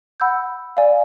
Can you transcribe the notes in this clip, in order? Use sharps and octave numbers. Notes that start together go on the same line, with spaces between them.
F#5 B5 E6 G6
D5 F5 G#5